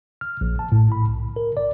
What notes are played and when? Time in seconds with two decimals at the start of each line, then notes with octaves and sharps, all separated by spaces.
0.21 F6
0.41 A#1
0.59 A5
0.72 A2
0.92 B5
1.08 B1
1.36 A#4
1.57 D5